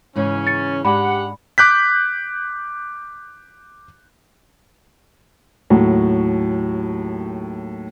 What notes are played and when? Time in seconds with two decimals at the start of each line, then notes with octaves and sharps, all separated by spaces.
0.16 G#2 C#3 E3 C#4
0.47 A6 C#7
0.85 G#2 D4 G4 F#5 G#5 B5
1.58 D6 F#6 G6 B6
5.70 D#2 A2 F#3